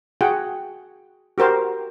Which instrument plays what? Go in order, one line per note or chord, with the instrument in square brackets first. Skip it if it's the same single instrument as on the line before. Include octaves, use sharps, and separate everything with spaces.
[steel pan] F#4 G#4 F#5 G5
F#4 G4 A#4 C5